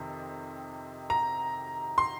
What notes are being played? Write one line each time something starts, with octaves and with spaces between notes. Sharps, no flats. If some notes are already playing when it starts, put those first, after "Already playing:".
Already playing: F2 C3 D#3
A#5
C6